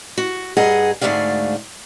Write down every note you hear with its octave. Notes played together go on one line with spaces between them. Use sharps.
F#4
G2 G#4 D#5 F#5 A#5
D2 G#2 A3 G#4 D5 F5